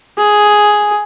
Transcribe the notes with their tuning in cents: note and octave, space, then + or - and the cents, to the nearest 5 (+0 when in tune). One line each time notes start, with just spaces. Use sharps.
G#4 +5